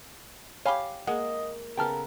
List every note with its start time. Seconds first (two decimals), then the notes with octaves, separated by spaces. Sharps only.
0.66 G4 C#5 F5 G#5 B5
1.07 G#3 A#3 D#5 F#5
1.77 C#3 B3 A4 A#4 G5 A5 F6